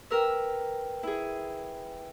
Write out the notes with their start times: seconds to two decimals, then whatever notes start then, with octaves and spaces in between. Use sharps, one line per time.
0.11 A#4 B4 G5 E6
1.03 E4 G#4